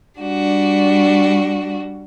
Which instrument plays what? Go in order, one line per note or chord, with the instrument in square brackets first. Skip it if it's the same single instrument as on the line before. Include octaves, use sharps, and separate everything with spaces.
[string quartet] G3 D4 F#4